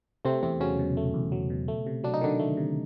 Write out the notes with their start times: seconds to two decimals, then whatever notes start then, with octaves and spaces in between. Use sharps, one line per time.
0.25 C3 A3 C4
0.43 E2 C3 C4
0.60 C#3 F#3 C#4
0.79 B2
0.97 A3
1.14 E2
1.32 F#3
1.50 B2
1.68 A3
1.87 C3
2.04 F#3 D4
2.14 D#4
2.21 D3 D#3 D4
2.39 A3
2.57 C3